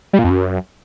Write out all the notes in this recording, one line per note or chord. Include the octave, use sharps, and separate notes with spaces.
G3
A#2
F2
F#2